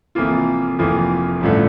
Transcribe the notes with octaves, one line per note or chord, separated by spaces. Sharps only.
F1 F2 E3 A#3 F4
F1 F2 E3 A#3 F4
A1 G2 D3 F3 A3